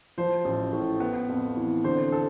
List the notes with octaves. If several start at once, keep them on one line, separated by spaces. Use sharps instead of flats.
F3 C5
A1
A2
B3
F2
E3
D3 C5
A4